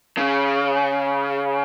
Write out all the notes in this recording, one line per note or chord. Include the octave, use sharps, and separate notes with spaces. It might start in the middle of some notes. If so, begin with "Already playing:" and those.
C#3